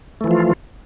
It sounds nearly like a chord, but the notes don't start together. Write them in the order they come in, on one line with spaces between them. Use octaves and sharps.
A3 E3 F3 F4